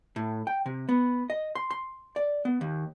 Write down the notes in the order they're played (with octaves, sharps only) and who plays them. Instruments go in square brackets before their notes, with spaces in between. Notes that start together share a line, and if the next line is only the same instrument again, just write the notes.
[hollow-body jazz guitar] A2
G5
C3
B3
D#5
C6
C6
D5
B3
D#2